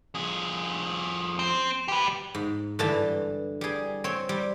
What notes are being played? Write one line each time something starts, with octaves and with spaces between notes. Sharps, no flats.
F2 G#4
C4
G4 B4
G#2
G2 D3 E3 A5 B5
G3 G#4
C4 C#5
G3